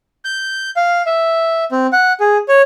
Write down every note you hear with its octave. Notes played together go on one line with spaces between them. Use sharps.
G6
F5
E5
C4
F#5
G#4
C#5